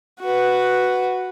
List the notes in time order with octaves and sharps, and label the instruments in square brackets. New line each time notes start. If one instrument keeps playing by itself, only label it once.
[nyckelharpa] F#4 B4